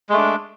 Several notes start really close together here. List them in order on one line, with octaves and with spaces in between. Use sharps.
G#3 A3 D4